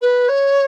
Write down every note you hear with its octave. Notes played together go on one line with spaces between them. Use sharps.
B4
C#5